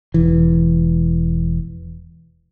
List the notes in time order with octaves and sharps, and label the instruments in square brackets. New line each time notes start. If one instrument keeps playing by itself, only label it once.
[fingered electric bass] E1 E3